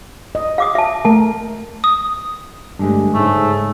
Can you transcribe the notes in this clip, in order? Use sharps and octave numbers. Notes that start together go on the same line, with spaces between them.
D#5
F5 D6 D#6
E5 A5
A3 A#4 A5
D#6
G2 D3 G#3 A3
G#2 C#3 A3 C#4